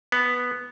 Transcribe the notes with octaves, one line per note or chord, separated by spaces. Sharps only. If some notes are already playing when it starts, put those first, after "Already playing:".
B3